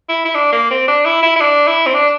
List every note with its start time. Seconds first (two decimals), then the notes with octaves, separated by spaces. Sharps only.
0.09 E4
0.25 E4
0.35 D4
0.53 A#3
0.71 C4
0.88 D4
1.06 E4
1.23 E4
1.36 E4
1.41 D4
1.67 E4
1.86 C4
1.94 D4